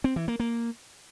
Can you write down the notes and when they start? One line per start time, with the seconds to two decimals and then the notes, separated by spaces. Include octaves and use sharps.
0.04 C4
0.16 E3
0.28 A#3
0.40 A#3